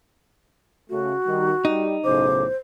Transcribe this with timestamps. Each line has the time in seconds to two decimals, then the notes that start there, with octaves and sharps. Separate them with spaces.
0.89 C#3 A3 F#4
1.25 D#3 G3
1.65 G3 D#4 G4
2.04 B1 A2 C#3 C5 D6